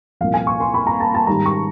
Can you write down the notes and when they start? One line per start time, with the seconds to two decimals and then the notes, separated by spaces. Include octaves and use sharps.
0.21 C2 A#2 F3 F5
0.34 G#5
0.47 C#6
0.60 C6
0.74 B5
0.87 A#5
1.00 A5
1.15 A5
1.27 G#2 D#3 G3 A#5
1.46 C#6